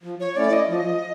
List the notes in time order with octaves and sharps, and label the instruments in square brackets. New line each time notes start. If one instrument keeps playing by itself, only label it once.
[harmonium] F3
[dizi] C#5
[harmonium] A3 C#4 E4 [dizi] D5
[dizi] D#5
[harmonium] F3 [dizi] D#5